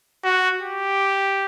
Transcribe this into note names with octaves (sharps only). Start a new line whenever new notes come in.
F#4
G4